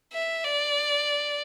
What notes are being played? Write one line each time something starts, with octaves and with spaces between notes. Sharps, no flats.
E5
D5